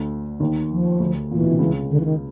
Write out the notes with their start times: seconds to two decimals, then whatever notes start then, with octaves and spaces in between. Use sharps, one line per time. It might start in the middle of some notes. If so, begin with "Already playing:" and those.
Already playing: D2 D3
0.40 D#2 D#3
0.70 F3
1.00 D2 D3
1.30 A#2 E3
1.41 B2
1.50 C3
1.59 C#2 C#3
1.89 D3
2.00 E3
2.04 D#3